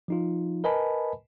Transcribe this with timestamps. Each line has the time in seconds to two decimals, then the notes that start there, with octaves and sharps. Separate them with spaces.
0.08 F3 D#4 F4
0.64 A#4 B4 D#5 G#5 A5 B5